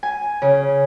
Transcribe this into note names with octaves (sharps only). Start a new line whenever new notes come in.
G#5
C#3